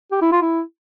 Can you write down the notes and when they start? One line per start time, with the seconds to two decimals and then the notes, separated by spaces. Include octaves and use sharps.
0.11 G4
0.22 E4
0.32 F4
0.42 E4